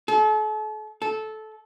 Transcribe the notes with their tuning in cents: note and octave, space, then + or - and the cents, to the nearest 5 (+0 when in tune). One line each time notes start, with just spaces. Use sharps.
A4 -40
A4 -15